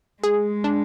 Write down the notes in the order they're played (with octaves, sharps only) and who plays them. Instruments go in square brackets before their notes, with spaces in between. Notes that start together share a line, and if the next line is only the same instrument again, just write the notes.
[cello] G#3 [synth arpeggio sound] G#4
[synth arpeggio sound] D4